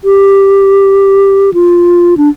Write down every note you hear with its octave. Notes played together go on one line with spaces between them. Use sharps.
G4
F4
D4